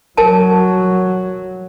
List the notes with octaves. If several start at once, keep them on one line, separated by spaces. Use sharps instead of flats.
F#3 A#4 G#5 A5